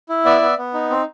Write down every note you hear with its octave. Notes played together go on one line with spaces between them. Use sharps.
E4
B3 D5 E5
B3
B3
D#4
C4